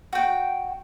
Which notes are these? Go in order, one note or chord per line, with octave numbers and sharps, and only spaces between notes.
F#4 G5